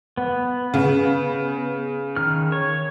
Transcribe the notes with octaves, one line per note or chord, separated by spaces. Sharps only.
B3
C#3
D#3 F6
C#5